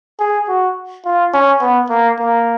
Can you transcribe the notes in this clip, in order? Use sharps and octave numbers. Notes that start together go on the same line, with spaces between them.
G#4
F#4
F4
C#4
B3
A#3
A#3